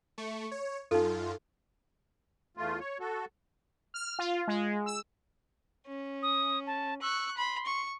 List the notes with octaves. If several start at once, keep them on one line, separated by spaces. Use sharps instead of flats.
A3 C#6
C#5
F#2 D#4 F4 A4
E2 A3 F4
C#5
F#4 A4
F6
F4
G#3
E6
C#4
D#6
A5
C#6 E6 F#6
B5 C6
C#6